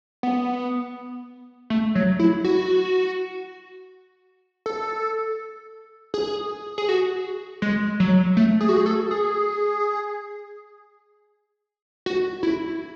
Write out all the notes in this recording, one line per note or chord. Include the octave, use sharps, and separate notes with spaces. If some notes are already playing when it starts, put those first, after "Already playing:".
B3
A3
F#3
E4
F#4
A4
G#4
G#4
F#4
G#3
F#3
A3
G#4
F#4
G#4
A4
G#4
F#4
E4